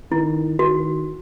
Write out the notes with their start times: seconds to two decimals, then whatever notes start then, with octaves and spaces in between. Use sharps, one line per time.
0.12 D#3 E4
0.59 D#3 F#4